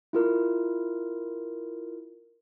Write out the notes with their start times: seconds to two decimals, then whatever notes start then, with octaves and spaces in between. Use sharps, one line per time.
0.13 E4 F4 A#4